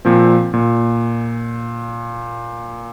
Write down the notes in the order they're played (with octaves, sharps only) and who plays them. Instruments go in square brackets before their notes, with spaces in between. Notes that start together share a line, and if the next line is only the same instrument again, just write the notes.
[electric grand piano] A#2 F3 C4
A#2